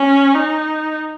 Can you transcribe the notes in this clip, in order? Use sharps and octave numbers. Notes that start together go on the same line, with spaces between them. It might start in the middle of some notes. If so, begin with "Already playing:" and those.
Already playing: C#4
D#4